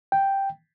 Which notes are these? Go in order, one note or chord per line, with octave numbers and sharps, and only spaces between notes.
G5